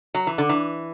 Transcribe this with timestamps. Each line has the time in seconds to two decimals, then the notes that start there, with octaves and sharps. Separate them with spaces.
0.15 F#3
0.27 E3
0.38 D3
0.49 E3